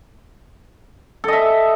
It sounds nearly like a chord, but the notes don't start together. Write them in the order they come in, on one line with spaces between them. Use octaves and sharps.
A4 D#5 E5